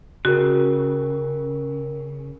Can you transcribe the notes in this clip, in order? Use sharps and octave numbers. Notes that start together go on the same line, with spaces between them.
C#3 C#4 F#4 A#4